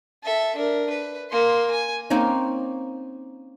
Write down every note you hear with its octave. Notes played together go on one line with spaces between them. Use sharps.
A4 E5
D4 A#4
B4
A#3 C6
G#5
A#3 C4 C#4 D#4